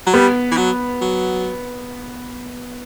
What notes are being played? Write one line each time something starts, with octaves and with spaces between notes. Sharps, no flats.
F#3
G3 B3
E3
F#3
F#3